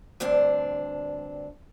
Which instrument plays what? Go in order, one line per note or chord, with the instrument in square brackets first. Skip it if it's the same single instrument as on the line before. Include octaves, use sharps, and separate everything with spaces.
[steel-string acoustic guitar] D2 G2 C4 D4